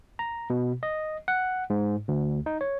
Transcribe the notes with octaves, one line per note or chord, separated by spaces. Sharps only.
A#5
B2
D#5
F#5
G#2
D2
D#4
C#5